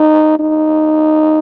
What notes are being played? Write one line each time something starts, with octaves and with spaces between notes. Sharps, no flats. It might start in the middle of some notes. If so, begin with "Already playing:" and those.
Already playing: D#4
D#4